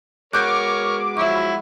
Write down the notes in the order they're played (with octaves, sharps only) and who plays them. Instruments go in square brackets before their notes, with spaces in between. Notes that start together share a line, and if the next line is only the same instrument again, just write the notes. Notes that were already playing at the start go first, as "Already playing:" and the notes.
[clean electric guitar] G#3 B3 F#4 [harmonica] A#4 C#5 [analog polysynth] D6 [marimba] F#6 G6
[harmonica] F3 F#3 E4 [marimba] E5 C#6